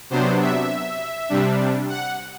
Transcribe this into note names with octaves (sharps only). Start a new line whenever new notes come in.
C3 F#3 B3 D4 C5
E5
C3 G3 D4
F#5